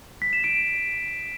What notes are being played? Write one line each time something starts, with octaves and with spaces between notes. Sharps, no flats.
B6
E7
D7